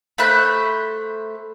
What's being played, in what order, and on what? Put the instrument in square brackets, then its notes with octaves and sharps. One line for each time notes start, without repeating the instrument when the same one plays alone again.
[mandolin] A3 C5 B5 F#6